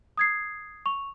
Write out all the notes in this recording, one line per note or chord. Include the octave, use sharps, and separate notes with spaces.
D#6 G#6 C7
C#6 F7